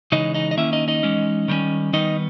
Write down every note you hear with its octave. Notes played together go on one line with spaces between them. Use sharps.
C#3 E3 G#3 D#4 D#5
D#4 D#5
D#5
D#3 A#3 C#4 E4 E5
D#4 D#5
D#4 D#5
E3 G#3 C#4
D#3 G3 A#3 C#4
D#3 G3 B3 D#4 D#5